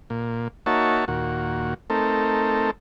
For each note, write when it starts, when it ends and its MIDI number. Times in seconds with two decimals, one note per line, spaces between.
0.10 0.48 46
0.66 1.05 58
0.66 1.05 63
0.66 1.05 66
0.66 1.05 73
0.66 1.05 76
0.66 1.05 81
1.08 1.74 39
1.08 1.74 46
1.08 1.74 66
1.90 2.71 57
1.90 2.71 60
1.90 2.71 63
1.90 2.71 69
1.90 2.71 70